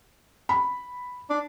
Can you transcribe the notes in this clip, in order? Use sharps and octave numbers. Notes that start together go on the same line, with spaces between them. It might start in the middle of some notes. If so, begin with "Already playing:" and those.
B5
D4